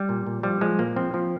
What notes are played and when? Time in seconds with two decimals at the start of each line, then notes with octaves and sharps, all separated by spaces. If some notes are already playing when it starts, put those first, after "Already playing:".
Already playing: G3
0.09 A#2
0.27 A#2
0.43 F3 G3
0.61 F3 G#3
0.79 A#2 A#3
0.96 F3 C4
1.14 F3